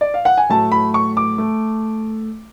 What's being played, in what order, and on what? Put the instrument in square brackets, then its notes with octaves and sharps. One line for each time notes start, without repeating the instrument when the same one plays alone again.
[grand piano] D5
F5
F#5
G#5
A2 F#3 A3 A5
B5
C#6
D6
A3